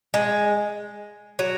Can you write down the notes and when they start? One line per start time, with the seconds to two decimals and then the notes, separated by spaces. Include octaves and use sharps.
0.14 G#3
1.39 F#3